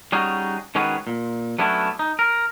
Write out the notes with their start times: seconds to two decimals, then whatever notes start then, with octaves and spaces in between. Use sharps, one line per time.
0.12 G3 C#4 D#4 F#4 G#4
0.75 D#3 G#3 C#4 F#4 G#4 B4
1.07 A#2
1.59 F#3 A3 B3 C#4 D4 E4
1.99 D#4
2.19 A#4